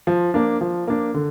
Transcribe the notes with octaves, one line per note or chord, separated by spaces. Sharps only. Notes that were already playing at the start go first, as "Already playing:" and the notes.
F3
A#3 D4
F3
A#3 D4
D3